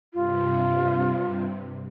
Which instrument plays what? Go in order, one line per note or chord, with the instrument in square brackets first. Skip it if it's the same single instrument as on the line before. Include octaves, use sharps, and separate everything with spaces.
[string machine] G2 C3 [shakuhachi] F4